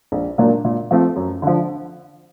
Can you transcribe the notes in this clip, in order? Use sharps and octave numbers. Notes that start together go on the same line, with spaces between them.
A#1
A#2 F#3 A#3 D4
A#2
F3 A3 C4 F4
F#2
D3 F3